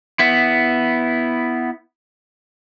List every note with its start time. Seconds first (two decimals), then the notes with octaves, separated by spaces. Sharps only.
0.19 B3 E4